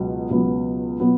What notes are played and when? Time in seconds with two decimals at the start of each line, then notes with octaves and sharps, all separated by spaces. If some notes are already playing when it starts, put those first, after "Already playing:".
Already playing: C#2 B2 F#3 B3
0.31 C#2 B2 F#3 B3
1.00 B2 F#3 B3